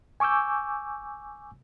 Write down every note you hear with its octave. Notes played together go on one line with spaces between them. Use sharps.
G#5 C#6 D6 E6 G6